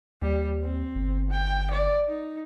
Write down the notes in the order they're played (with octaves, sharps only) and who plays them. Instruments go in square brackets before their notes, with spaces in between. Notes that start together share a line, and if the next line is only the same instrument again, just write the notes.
[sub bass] D#2 [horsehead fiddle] G3
[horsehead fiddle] C4
[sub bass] G1
[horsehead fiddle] G5
D5
D#4